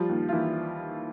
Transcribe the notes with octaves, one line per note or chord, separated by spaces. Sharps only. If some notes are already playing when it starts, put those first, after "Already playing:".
Already playing: F3 G3 F4
D#2
F4
D#2 E3 E4